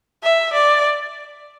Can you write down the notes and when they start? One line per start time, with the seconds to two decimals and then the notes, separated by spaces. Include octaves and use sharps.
0.23 E5
0.53 D5